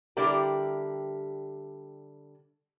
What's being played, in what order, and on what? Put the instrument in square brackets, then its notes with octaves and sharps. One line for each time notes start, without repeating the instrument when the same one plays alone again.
[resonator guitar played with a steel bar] D3 G3 E4 G4 A#4